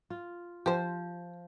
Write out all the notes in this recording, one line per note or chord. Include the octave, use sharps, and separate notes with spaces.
F4
F3 G4 C5